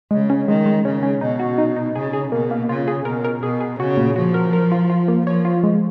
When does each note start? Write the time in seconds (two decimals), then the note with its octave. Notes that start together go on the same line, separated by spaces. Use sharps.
0.11 C#3 G#3
0.30 C#4
0.48 D#3 G#3
0.66 G#3
0.85 C#3 C#4
1.03 C#4
1.21 B2 D#4
1.40 F#4
1.58 D#4
1.76 D#4
1.96 C#3 G#4
2.13 G#4
2.32 B2 A#3
2.51 A#3
2.69 C#3 F4
2.88 G#4
3.05 B2 A#4
3.24 A#4
3.43 B2 G#4
3.61 G#4
3.80 C#3 F#4
3.97 A#2
4.16 F3 F#4
4.34 A#4
4.53 A#4
4.72 F4
4.90 F4
5.08 A#3
5.26 F3 C#5
5.45 F4
5.64 G#3